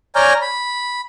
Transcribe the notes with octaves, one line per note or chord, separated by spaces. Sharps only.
C#5 D5 G#5 A#5 F6 G6
B5